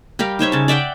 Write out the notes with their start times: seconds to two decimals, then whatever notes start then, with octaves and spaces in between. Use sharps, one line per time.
0.19 G3 G4 A#4 F5
0.39 D#4 C5 C#5 E5
0.52 C#3 A5
0.68 D5 E5 F#5 G5